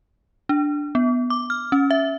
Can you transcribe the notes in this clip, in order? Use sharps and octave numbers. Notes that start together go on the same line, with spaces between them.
D4
B3
D6
F6
C#4
E5